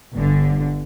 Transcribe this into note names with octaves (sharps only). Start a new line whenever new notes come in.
G1 D3